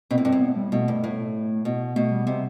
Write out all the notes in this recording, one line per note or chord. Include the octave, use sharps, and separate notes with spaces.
B2 C4
A2
G2 C4
A2
B3
G3
B2 A3
G2
A2
B2
B2 A3
G3
C3 G3